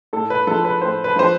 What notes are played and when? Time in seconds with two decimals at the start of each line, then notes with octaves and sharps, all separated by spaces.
0.13 A2 A4
0.30 B4
0.47 F3 G#3 A4
0.65 B4
0.81 A2 C5
1.04 B4
1.16 F3 G#3 C5